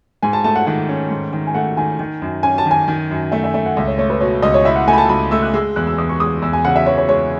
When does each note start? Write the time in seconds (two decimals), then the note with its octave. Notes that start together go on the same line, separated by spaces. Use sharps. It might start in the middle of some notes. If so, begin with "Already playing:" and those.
0.23 G#2 G#5
0.33 A5
0.44 A3 A5
0.56 F#5
0.66 D#3 F#5
0.89 C#4
1.11 G#2
1.33 D#3
1.47 G#5
1.54 A3 F#5
1.77 D#3 G#5
1.99 D#3
2.22 F#2
2.43 C#4 G#5
2.58 A5
2.66 D#3
2.71 G#5
2.88 D#3
3.10 F#2
3.32 A3 E5
3.44 E5
3.54 A3 E5
3.66 F#5
3.76 C#2 E5
3.87 C#5
3.98 A3 C#5
4.10 B4
4.21 B2 C#5
4.42 C#2 D#5
4.54 C#5
4.65 E4 E5
4.76 F#5
4.87 A3 G#5
4.93 B5
4.98 A5
5.09 C#2 B5
5.31 A3 E6
5.43 F#6
5.54 G#3 E6
5.76 E2 F#6
5.87 E6
5.98 E2 D#6
6.09 C#6
6.20 G#3 D#6
6.42 E2 E6
6.53 G#5
6.64 C#3 F#5
6.76 E5
6.86 E3 C#5
6.98 C#5
7.09 G#3 C#5